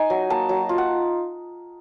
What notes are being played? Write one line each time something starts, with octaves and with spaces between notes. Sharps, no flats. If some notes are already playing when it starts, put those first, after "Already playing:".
Already playing: D#4 G#5
F#3
A#3 A5
F#3
F4
F#5